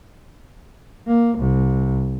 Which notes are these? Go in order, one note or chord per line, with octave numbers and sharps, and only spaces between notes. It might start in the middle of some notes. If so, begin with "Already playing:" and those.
A#3
C2